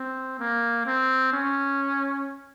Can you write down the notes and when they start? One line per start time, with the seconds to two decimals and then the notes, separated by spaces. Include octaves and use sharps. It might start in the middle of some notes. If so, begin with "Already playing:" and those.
Already playing: C4
0.39 A#3
0.86 C4
1.33 C#4